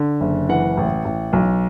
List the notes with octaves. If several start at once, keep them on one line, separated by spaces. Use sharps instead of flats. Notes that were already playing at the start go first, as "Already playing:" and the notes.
Already playing: D3
F#1
E3 F#5
A1
A1
B1